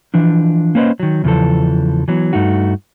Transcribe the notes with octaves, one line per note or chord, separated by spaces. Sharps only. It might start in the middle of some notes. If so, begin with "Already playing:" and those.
E3 F3 D4
A#3 C#4 B4 C5 D#5
D#3 F#3
E2 A#2 C#3 E3 F3 A4
E3 F#3 B3
G2 A3 D#4 F#4